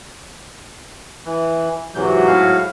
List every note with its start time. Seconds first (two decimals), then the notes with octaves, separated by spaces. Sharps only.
1.26 E3
1.95 G#2 C3 E3 F#3 G6
2.27 A2 F5